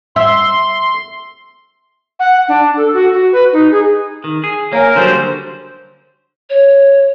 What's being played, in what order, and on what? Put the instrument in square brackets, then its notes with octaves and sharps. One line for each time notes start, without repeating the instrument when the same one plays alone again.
[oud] E5 [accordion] C6
[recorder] F#5
D4
A4
F#4
F#4
B4
D#4
G#4
[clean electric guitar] D#3
G#4
[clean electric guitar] A#3 [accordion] A#4 [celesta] C#5 F5 G#5
[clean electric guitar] D3 F#3 G3 [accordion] C5
[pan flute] C#5